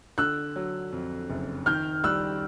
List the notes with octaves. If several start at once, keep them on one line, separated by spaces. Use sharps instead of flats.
D3 E6 F#6
F#3
F2
F#1
D#3 F6 G6
G3 E6 F#6